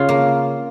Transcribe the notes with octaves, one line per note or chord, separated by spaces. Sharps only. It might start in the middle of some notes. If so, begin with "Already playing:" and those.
Already playing: C#3 F4
A#3